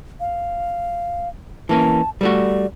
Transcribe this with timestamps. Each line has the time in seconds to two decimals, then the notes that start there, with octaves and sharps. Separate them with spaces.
0.20 F5
1.69 E3 A#3 C#4 A5
2.21 G3 A3 F#4 D5